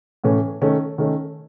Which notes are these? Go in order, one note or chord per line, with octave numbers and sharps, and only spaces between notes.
A2 E3 A3 C#4
D#3 A3 C#4
D#3 A3 C#4